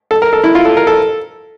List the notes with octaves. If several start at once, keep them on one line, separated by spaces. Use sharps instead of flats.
A4
A#4
A4
E4
F4
A4
A#4
A4